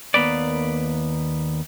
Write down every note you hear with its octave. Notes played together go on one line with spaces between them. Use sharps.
D#2 A#3 B3 B4 D5